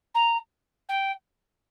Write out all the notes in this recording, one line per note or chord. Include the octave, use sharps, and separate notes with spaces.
A#5
G5